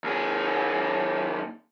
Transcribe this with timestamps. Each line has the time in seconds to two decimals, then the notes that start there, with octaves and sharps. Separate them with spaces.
0.04 D#2 G#4